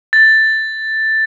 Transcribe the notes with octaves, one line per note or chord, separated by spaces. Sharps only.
A6